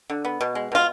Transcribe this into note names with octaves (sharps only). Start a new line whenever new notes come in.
D3
B3
B2
G#3
B2 F4